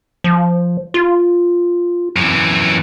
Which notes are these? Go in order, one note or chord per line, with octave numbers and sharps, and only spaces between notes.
F3
F4
F#2 E3